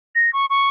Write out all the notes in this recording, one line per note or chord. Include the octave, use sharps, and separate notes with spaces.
A#6
C#6
C#6